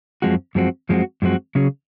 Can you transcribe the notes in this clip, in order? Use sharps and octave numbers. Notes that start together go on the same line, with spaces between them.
F#2 F3 G#3 C4 F#4
F#2 F3 G#3 C4 F#4
F#2 F3 G#3 C4 F#4
F#2 F3 G#3 C4 F#4
C#3 F#3 C#4 G#4